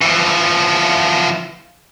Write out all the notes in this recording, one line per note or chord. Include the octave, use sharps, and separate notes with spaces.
E3 F3